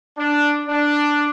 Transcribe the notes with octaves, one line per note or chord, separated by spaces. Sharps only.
D4
D4